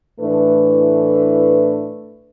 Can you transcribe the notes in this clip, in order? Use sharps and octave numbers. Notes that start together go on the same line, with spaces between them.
A2 E3 A3 D4 B4